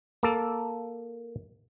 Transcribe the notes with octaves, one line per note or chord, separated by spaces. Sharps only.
A#3 A4